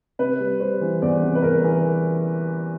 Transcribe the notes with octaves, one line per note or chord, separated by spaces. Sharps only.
C3 B4
G3
G3 C5
E3
E2 D5
C3
B4
E2 A#4
E3